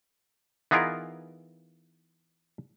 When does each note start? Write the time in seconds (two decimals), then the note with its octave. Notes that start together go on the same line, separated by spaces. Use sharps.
0.71 E3 B3 D#4 F4 G#4 A#4